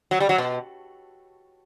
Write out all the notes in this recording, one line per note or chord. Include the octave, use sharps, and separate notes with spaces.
F#3
G3
F#3
B2